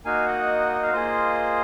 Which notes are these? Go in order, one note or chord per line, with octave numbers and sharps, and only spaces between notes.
A#3 D#4 F#4 F5 G#5
D#5 F#5
F5
A#3 F4 G#4 C5 D#5